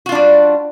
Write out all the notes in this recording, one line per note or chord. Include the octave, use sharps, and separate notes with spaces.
G3 D4 F4 F#4